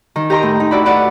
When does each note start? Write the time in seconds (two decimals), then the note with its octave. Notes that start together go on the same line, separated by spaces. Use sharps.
0.16 D#3
0.30 G4 A#4 D#5 G5 A#5 C6
0.43 A2
0.60 D#4
0.71 E4 F#4 D5 B5
0.85 F#4 B4 D5 F#5